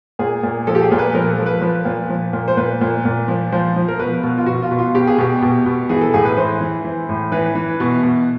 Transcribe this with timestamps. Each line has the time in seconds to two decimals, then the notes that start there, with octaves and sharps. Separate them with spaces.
0.19 A#2 G#4
0.43 A#2
0.67 F3 A4
0.75 G4
0.82 G#4
0.91 A#2
0.98 B4
1.14 F3 A#4
1.30 A4
1.39 F3
1.46 B4
1.61 F3 B4
1.85 A#2
2.10 F3
2.33 A#2
2.48 C5
2.57 A#2 B4
2.81 A#2
3.05 A#2
3.28 F3
3.52 F3 C5
3.76 F3
3.88 A#4
3.99 B2 B4
4.23 B2
4.38 F4
4.46 B2 F#4
4.62 F4
4.71 B2
4.79 F4
4.95 B2 G4
5.07 G#4
5.18 B2 G4
5.42 B2
5.66 B2
5.89 E3 G#4
6.01 A4
6.14 A2 G#4
6.25 B4
6.37 E3 C5
6.61 E3
6.85 E3
7.09 A2
7.32 E3 B4
7.55 E3
7.80 B2
8.03 B2